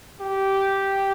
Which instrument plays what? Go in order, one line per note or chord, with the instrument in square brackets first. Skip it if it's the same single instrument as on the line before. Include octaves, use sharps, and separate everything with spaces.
[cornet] G4